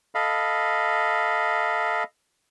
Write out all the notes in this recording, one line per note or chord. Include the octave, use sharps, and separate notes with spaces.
A4 D#5 F5 B5